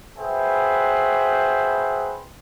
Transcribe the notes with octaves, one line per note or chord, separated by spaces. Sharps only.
F#4 G#4 B4 C5 E5 G5